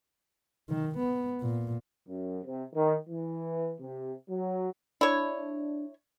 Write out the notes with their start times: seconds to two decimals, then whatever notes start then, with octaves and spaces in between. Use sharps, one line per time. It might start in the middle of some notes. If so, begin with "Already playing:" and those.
0.69 D#3
0.98 B3
1.41 A#2
2.08 F#2
2.44 C3
2.74 D#3
3.08 E3
3.80 C3
4.29 F#3
5.01 D4 E4 C#5